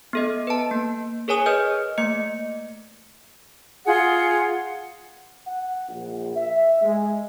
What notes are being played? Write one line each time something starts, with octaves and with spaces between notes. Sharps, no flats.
B3 A4 D#5
B4 A5
A#3
G#4 A#4 C#5 G#5 D#6
G#4 B4 D#5 F6 G6
A3 A#3 D#5 C#7
F4 G#4 F#5
F#5
A#1
E5
G#3